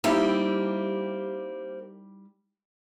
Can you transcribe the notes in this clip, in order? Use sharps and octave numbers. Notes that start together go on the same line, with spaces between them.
G3 A#3 C4 D#4 E4 G4